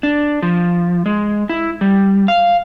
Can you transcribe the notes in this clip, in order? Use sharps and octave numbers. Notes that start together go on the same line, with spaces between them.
D4
F3
G#3
E4
G3
F5